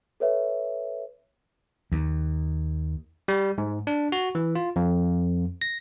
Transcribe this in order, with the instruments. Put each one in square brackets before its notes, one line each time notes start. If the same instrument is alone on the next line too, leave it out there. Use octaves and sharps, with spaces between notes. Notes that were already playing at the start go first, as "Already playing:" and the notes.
[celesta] A4 B4 C#5 E5
[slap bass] D#2
[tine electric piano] G3
G#2
D4
F#4
E3
F4
F2
A#6